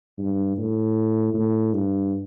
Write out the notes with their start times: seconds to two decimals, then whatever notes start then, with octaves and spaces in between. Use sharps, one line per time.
0.18 G2
0.57 A2
1.34 A2
1.74 G2